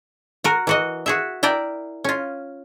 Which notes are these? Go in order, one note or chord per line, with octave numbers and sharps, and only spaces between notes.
F#4 A#4
E3 F#4 D#5
F#4 G#4 E5
E4 A#4 D5 G5
C#4 F4